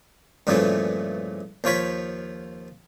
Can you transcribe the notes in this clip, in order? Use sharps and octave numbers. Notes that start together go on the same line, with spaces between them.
G2 A#2 C#3 E3 F3 A3
D#2 F3 F4 C#5 B5